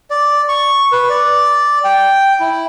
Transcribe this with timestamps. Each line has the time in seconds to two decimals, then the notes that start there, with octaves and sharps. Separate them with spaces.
0.10 D5
0.48 C#6
0.92 B4
1.09 D5
1.84 G5
2.40 E4